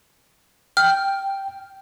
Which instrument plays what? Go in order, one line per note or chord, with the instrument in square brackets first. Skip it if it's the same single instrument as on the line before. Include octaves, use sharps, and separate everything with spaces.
[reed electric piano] G5 [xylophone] F6